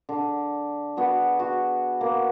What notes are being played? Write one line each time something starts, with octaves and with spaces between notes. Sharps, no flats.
D3
B3 F#4 G#4
F#4
A#3 B3